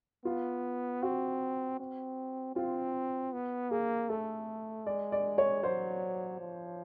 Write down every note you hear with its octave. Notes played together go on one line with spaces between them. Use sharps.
B3 F4
C4 F#4
C4
C4 F4
B3
A#3 G#4
A3 A4
G#3 D5
D5
C#5
F#3 C5
F3